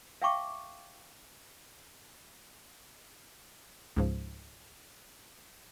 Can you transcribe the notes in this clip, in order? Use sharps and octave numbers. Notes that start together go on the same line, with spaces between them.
E5 F5 G5 A5 C#6 D6
C#2 G#2 F3